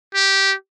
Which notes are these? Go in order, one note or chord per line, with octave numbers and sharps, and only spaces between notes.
G4